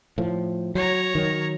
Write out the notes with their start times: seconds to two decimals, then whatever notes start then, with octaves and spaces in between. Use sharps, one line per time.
0.18 A2 F3
0.75 F#3 C#5 A#5
1.15 D#3 F#3